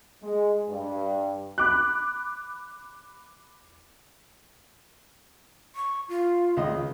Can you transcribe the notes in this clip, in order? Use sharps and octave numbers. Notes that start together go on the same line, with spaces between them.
G#3
G2
B5 D6 F#6
C#6
F4
C#2 D#5